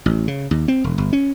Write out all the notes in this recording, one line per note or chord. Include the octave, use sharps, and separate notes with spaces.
A1
C#3
D#2
C4
E1
G1
C#4